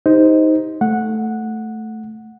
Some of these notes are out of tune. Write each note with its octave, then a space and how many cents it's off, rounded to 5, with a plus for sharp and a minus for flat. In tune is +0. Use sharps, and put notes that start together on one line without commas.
D#4 +15 G4 +10 C5 -5
A3 +0 F#5 -10